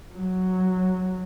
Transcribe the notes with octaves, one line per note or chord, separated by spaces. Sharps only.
F#3